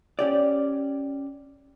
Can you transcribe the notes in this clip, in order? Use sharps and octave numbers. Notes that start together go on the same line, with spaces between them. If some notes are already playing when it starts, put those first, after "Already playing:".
C#4 G4 D5